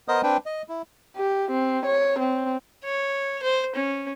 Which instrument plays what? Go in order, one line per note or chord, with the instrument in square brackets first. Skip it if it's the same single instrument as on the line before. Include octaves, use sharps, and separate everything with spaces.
[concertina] B3 A#4 C5 D#5 D#6
C4 D4 B4 G5
D#5
E4
[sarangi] G4
C4
C#5
C4
[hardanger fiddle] C#5
C5
C#4